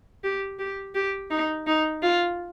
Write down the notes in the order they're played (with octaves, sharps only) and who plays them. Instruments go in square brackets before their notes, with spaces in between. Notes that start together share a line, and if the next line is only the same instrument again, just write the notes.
[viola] G4
G4
G4
D#4
D#4
F4